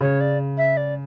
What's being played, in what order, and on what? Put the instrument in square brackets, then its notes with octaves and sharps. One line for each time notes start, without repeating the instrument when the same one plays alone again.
[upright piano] C#3 [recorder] C#5
[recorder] D5
E5
D5